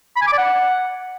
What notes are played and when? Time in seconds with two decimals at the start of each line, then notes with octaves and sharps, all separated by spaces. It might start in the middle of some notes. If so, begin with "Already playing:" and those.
0.16 B5
0.22 G#5
0.27 D6
0.33 D5
0.38 F#5